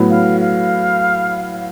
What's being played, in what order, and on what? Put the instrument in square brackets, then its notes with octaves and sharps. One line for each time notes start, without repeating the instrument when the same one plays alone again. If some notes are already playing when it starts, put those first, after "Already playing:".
Already playing: [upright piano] A2 F#3 B3
[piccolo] F5
F5